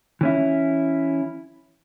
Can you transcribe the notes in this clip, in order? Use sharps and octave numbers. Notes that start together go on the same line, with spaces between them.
E3 C#4 E4